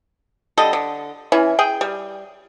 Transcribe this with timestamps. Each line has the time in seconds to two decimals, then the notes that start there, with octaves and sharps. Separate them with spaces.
0.58 D3 G3 A4 D#5
0.73 D3
1.32 E3 C#4 E4
1.59 G#4 G5
1.81 G3